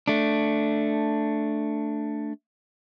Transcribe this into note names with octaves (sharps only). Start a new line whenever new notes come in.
A3 D4